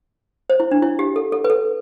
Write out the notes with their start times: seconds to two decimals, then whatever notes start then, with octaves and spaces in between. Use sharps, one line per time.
0.50 C5
0.60 E4
0.71 D4
0.82 E4
0.99 G4
1.16 A4
1.32 A4
1.44 B4
1.50 A4